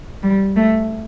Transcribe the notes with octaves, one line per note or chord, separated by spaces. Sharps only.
G3
A3